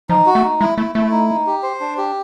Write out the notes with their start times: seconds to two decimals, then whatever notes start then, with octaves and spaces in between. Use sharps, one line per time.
0.09 F3 D#4
0.26 F#4
0.35 A3
0.44 D#4
0.61 G#3 E4
0.78 A3 E4
0.95 A3 E4
1.11 D#4
1.29 D#4
1.46 G4
1.63 C5
1.80 D4
1.98 G4